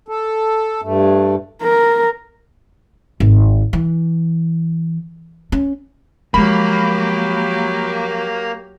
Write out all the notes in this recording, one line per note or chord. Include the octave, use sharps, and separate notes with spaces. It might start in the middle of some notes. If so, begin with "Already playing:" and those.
A4
G2 A3
A#4
G#1
E3
C#4
F3 F#3 G#3 A#3 G4 B5